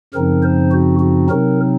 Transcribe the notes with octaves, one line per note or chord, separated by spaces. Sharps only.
F#2 C#3 F3 C4 D#4 A#4
C5
F#4
F#4
C3 F#3 C4 D#4 A#4